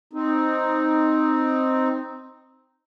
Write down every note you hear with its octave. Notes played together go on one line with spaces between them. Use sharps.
C4 D#4